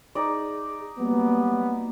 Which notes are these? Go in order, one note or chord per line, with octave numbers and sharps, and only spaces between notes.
D#4 G#4 D5
F#3 G3 A#3 B3